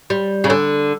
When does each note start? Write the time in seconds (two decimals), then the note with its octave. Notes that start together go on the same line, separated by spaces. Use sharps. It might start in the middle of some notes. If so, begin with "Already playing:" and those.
0.10 G3
0.44 C#3
0.50 D3